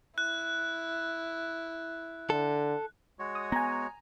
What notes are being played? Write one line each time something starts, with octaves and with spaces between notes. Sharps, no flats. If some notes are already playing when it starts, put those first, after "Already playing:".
E4 F#6
D3 A4
G#3 F#4 C#5
D#6
B3 G#5 A#5